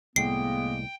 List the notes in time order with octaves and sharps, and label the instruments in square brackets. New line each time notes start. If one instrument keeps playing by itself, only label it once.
[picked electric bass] C2 A2 [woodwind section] G#3 A#3 B3 [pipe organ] G5 [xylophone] C7